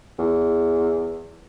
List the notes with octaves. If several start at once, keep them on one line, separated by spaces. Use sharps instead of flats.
E2